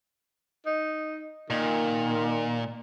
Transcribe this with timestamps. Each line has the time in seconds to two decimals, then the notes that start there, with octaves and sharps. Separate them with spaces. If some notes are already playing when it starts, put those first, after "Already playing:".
0.66 D#4
1.50 A#2 D#3